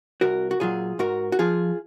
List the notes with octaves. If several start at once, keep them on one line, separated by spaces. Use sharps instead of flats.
C2 F#4 A#4
F#4
A#2 F#3 F4 G#4
G#2 F#4 A#4
F#4
F3 F4 G#4